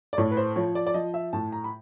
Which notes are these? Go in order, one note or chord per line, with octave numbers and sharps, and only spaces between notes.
D5
A2 C#5
B4
C5
F3 C#5
D5
D5
F3 D#5
E5
A2 A5
A#5
B5